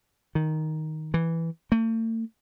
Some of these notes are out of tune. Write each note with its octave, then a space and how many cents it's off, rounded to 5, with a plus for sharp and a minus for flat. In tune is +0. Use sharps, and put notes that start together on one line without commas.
D#3 +5
E3 +0
A3 +45